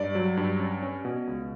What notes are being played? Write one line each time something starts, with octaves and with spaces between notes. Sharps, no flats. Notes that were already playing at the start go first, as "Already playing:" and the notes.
Already playing: G2 D5
F#3
G2
C#4
C#4
B2
C#2